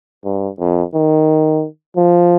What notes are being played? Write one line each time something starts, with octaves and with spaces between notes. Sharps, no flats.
G2
F2
D#3
F3